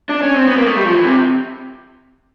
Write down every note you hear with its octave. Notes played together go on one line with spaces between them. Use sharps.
D4
C#4
C4
B3
A#3
A3
G3
F3
E3
C3